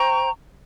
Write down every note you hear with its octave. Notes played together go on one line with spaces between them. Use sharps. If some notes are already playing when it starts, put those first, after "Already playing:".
Already playing: C5 G5 A#5 C#6